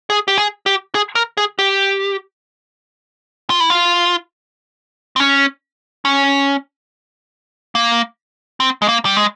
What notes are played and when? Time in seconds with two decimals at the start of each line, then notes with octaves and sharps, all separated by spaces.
0.10 G#4
0.28 G4
0.38 G#4
0.66 G4
0.95 G#4
1.15 A#4
1.37 G#4
1.59 G4
3.50 F4
3.60 E4
3.70 F4
5.16 C4
5.20 C#4
6.05 C#4
7.75 A#3
8.60 C4
8.82 G#3
8.88 A#3
9.05 G3
9.17 G#3